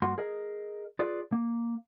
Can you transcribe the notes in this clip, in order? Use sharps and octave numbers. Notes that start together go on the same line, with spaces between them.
G2 A#3 F#4 C6
G#4 A#4 D#5
F4 G#4 B4 D5
A#3